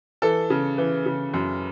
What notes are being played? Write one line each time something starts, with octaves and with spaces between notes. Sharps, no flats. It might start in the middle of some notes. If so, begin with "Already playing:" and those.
E3 A4
C#3
E3
C#3
F#2